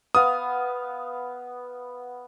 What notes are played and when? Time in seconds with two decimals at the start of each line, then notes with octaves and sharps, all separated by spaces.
0.15 B3 F5 D#6